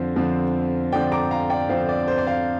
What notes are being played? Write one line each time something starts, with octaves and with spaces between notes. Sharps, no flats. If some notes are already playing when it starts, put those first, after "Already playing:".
Already playing: F2 D3 F3 C4
F2 D3 F3 C4
F2 D3 F3 C4 D5 G5
A#5 D6
F5 A#5
D5 G5
F2 D3 F3 C4 C5 F5
D5
C5
D5
C5 F5